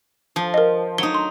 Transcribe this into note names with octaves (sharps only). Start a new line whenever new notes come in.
F3
A#4 D#5
F#3 D#4 G7
C6